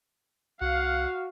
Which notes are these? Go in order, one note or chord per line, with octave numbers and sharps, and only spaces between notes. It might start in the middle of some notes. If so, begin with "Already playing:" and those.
C2 F#4 F5 F#5